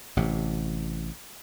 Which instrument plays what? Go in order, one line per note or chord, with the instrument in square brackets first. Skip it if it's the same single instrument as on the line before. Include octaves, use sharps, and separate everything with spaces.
[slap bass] A1 C3